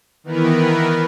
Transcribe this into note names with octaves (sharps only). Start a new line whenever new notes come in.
D#3 E3 B3 A#4 B4